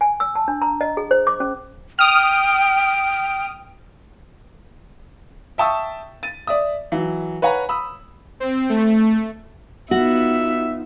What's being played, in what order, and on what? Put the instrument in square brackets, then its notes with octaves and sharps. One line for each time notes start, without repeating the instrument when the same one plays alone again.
[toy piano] G#5
E6
A5
D4
A#5
D#5
G#4
C5
D6
C#4
[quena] G5 [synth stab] D#6 F6
[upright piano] E5 G5 A5 C#6 D#6 E6
A6 D#7
D5 E5 D#6
E3 F#3
B4 C#5 F#5 G#5 A#5
B5 D#6 E6
[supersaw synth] C4
A3
[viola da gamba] B3 [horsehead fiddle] D#4 F4 [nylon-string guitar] F#4 [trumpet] E5